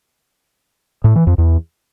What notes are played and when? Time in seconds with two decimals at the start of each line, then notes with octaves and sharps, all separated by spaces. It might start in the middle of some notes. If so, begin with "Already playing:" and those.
1.04 A2
1.16 E3
1.27 F2
1.38 E2